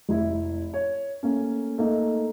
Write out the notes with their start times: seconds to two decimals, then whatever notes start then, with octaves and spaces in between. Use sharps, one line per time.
0.09 F1 E4
0.74 C#5
1.23 A3 A#3 C#4
1.78 A3 A#3 D#4